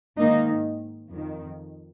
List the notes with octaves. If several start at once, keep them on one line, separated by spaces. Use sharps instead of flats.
G#2 D#3 A#3 D#4
F2 D#3